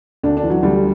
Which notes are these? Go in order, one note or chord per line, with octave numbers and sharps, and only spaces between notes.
D2 D4
D4
E3
F#3
D2 G3